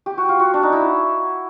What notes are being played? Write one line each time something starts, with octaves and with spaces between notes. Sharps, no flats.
G4
F#4
F4
F#4
D4
D#4
E4